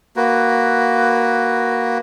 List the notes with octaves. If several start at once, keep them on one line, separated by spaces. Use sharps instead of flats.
A#3 F#4 B4